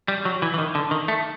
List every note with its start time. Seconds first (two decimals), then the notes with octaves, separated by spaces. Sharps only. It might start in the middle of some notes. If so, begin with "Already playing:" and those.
0.08 G3
0.25 F#3
0.42 E3
0.54 E3
0.58 D#3
0.75 D3
0.91 D#3
1.08 A3